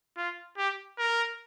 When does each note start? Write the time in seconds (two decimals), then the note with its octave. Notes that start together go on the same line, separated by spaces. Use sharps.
0.17 F4
0.58 G4
0.99 A#4